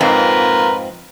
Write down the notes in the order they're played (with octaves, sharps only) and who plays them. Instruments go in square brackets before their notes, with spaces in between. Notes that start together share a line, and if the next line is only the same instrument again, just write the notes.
[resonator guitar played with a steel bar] F2 G#2 C4 [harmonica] F4 A#4 B4